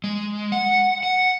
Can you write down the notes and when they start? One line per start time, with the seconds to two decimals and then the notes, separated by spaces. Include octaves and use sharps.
0.04 G#3
0.52 F#5
1.03 F#5